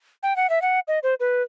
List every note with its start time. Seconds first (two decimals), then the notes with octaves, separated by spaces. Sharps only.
0.23 G5
0.36 F#5
0.50 E5
0.62 F#5
0.88 D#5
1.03 C5
1.20 B4